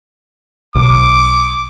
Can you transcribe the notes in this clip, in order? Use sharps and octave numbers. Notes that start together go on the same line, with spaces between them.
B1 D6